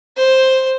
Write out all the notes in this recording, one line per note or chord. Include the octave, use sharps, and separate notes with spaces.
C5